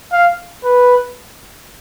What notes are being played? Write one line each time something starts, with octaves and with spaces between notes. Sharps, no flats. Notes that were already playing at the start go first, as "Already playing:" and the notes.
F5
B4